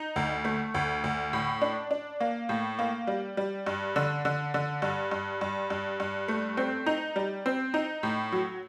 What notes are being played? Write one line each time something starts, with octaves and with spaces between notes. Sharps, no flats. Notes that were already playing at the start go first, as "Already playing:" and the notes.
Already playing: D#4
D2
A3
D2
D2
A2
D4
D4
A#3
A2
A#3
G3
G3
G2
D3
D3
D3
G2
G2
G2
G2
G2
A3
C4
D#4
G3
C4
D#4
A2
F#3